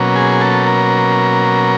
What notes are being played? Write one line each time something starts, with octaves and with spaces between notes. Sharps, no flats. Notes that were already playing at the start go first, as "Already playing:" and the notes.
Already playing: B2 F#3 A#3 C#4
G#4
A4
A#4